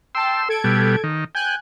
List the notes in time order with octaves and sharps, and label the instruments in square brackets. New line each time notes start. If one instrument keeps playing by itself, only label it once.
[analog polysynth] G5 A5 [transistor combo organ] C6 E6
[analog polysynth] A4 G#6 D7
[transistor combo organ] B2 G3
D#3
[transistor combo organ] G5 [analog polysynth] G#5 F#6